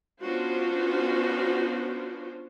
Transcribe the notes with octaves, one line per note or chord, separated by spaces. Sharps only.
B3 C#4 D4 F4 F#4 C5